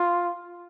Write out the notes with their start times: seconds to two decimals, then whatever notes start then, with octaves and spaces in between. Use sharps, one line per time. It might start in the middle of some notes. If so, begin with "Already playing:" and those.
Already playing: F4